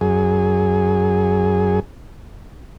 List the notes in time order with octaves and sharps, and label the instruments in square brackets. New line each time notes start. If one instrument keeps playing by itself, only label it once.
[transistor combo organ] F#2 G#4